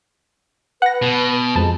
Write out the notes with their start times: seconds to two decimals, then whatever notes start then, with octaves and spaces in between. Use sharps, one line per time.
0.82 B4 F#5 A#6
1.02 B2
1.55 F2 G#3 A5